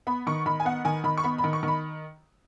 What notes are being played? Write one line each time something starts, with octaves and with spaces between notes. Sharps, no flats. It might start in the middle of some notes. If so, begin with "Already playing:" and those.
B3 B5
D#3 C#6
D#3 B5
G#5
B3 F#5
D#3 G#5
D#3 B5
C#6
B3 B5
B5
D#3
C#6
D#3
B5